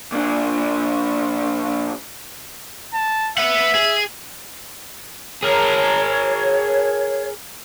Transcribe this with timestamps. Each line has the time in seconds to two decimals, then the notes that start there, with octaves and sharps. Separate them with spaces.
0.12 A#2 D4
2.94 A5
3.38 B4 E5 F#5
3.75 G#4
5.43 G#4 A#4 C#5